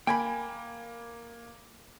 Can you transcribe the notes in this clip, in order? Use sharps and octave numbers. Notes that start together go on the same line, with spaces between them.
A#3 G5 G#5 B5